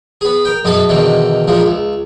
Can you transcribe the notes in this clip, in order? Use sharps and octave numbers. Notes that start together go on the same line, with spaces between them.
B3 G#4
A#4 G5
F#2 B2 B3 G#4 A4
E2 B2 D3 D#3
A#2 F3 G#3
C#2